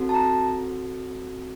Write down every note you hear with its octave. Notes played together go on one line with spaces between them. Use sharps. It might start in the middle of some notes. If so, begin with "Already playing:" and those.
Already playing: C4 F#4 A4
A5
A#5